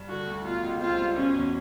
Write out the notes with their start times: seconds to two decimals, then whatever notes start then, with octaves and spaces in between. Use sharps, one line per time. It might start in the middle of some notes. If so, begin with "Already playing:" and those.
Already playing: G2
0.08 D3 F#4
0.27 D2
0.45 B2 F4
0.63 C#2
0.80 C4 F4
0.98 G3
1.16 B2 C#4
1.35 E2